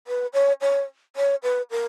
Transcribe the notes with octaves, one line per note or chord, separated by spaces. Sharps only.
B4
C#5
C#5
C#5
B4
A#4